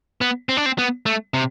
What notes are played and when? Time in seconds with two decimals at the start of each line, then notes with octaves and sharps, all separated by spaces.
0.21 B3
0.49 C4
0.57 D4
0.66 C4
0.78 B3
1.06 A3
1.34 C3